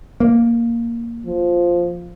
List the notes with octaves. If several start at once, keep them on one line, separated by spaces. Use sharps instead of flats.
A#3
F3